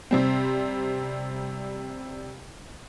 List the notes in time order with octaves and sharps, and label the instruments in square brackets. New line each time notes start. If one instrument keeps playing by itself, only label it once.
[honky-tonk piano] C3 G3 C4